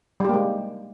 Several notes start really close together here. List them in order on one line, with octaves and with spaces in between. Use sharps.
G3 G4 A#3 G#3